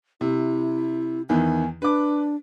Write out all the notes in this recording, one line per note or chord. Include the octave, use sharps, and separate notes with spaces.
C3 E4
E2 D#3 E3 G#5
D4 B4 D6